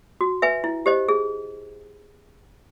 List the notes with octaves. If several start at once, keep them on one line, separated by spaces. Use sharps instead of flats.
F#4
B4 E5 G#5
E4
G4 C5 D#5
G#4